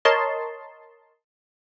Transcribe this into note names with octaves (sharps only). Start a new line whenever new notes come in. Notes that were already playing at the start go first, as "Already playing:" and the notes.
A#4 C#5 D#5 A5 C6